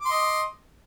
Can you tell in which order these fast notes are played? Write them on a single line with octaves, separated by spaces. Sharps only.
D6 C6 D#5